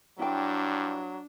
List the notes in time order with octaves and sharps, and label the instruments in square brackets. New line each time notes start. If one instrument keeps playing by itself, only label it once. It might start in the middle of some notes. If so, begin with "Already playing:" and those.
[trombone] G2 [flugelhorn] F#3 [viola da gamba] D4 [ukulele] E4 G5